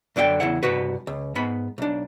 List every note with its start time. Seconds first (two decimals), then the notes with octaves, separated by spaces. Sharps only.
0.16 F#2 D3 D5 D#5 G5
0.40 E2 C#3 E4 F#5
0.63 G2 C3 F#4 B4
1.07 C#2
1.35 G#2 B3 B5
1.78 B1 D4